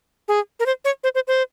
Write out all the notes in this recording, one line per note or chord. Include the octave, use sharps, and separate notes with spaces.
G#4
A#4
C5
C#5
C5
C5
C5